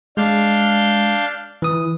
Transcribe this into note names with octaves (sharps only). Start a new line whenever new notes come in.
G#3 D4 F5 G6
E3 D#6